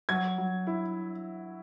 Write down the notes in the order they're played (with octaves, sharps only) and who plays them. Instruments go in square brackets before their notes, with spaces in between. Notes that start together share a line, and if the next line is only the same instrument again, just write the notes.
[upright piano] F#3 G#6
F#3
E4